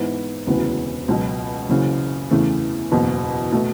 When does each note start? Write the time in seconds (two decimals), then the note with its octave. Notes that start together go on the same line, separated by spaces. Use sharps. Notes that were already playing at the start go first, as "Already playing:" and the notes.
Already playing: G#2 E3 B3 E4
0.47 E1 D2 C#3 E3 B3
1.08 C#2 B2 F#3
1.69 F#1 F#2 C#3 E3
2.31 E2 C#3 E3 A3
2.92 F#1 E2 B2
3.52 B2 A3